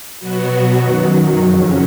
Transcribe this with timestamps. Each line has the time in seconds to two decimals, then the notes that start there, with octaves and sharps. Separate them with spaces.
0.20 B2 F#3 B3 F#4
0.81 F#2 D#3 F#3
1.42 F2 C#3 F#3 C#4